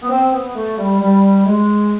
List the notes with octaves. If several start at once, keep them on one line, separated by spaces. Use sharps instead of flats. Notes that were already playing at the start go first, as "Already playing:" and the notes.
B3
C4
B3
A3
G3
G3
G#3